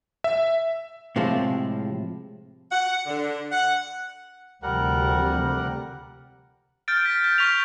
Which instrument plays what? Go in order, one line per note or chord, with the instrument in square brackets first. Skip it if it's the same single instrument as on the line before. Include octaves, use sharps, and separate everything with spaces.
[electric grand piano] E5
[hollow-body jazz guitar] A2 C3 F3 G#3 C4
[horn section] F#5
D3
F#5
[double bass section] D2 C3 F3 [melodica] G3 A#4 F#5
[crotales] F6 G6 A6 D7
B6
G6
C#6 F6 B6 F7